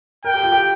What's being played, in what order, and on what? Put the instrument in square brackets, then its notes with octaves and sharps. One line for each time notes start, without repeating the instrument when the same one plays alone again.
[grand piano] A#4 [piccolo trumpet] G5
[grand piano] G4
F4
G4